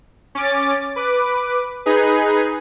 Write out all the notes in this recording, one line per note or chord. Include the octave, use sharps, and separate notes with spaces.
C#4 D6 A6
B4 D6
D#4 G#4 B4